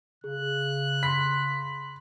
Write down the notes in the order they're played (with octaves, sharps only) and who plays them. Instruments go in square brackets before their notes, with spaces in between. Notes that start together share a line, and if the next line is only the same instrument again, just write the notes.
[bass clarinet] C#3 [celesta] G#4 [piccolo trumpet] F#6
[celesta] B5 C6 [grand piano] B6